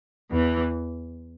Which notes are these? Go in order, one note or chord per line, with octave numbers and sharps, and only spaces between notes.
E2 E3